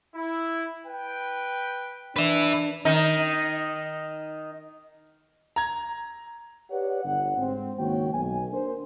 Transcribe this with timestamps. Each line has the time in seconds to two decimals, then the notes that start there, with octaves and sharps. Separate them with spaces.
0.15 E4
0.86 B4 G5
2.16 D4 B4 E5
2.85 D#3 D#4
5.56 A#5 G#6
6.71 G4 B4 C#5 D5 F#5
7.04 G1 F#5
7.38 G#2 C4
7.78 C#2 D#3 A#3 F#4 C#5 G5
8.14 B1 G#5
8.52 A#3 D4 A#4 C5